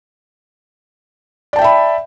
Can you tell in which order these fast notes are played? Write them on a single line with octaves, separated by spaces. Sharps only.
D5 A5 G5 E5 B5